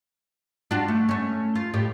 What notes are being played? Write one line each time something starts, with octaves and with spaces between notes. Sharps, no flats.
D4 F4 F#4
A3
A3 C#4
F4
A2 G4